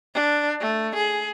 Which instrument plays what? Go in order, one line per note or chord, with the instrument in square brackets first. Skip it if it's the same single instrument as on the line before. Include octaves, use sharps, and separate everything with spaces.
[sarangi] D4
A3
G#4